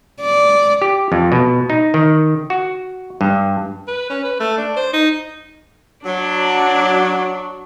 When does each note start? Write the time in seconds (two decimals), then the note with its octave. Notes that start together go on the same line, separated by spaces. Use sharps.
0.21 D5
0.82 G4
1.12 F2
1.32 B2
1.70 D#4
1.94 D#3
2.50 F#4
3.21 G2
3.87 B4
4.10 C#4
4.24 B4
4.40 A3
4.58 D4
4.77 C5
4.93 D#4
6.06 F#3 D4